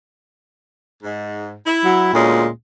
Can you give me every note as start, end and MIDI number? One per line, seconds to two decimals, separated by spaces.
1.03 1.53 44
1.65 2.09 64
1.85 2.10 54
2.13 2.45 38
2.13 2.49 46
2.13 2.45 56
2.13 2.45 61